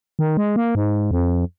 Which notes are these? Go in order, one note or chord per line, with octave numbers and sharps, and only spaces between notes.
D#3
G#3
A#3
G#2
F2